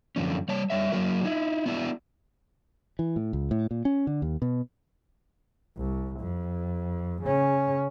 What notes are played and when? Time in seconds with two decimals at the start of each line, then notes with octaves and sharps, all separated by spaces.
0.16 F#2 D3 F3 C#4
0.48 G3 C#5 A5
0.70 G3 C#5 E5
0.92 F#3 A#3 F#4 A#4
1.24 D#4 E4
1.66 B3 D4 E4 F#4
2.99 E3
3.16 A2
3.33 C#2
3.51 A2
3.71 A#2
3.85 C#4
4.07 D3
4.22 D#2
4.42 B2
5.78 C2
6.20 F2
7.23 C#3 C#4